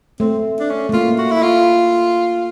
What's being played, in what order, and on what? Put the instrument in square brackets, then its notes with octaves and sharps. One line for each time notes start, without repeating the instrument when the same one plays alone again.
[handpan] A3 [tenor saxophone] C4
[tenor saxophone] D4
C#4
[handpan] A3
[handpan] A#3 [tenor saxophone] F4
[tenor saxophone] F#4
E4
F4